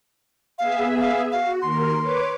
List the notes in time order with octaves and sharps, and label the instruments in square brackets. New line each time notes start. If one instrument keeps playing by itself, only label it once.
[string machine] B3 G#4 E5 [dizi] F5
[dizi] F5
[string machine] F#4 [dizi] F5
[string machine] D#2 A#4 [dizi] C6
[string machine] B4 C#5 D6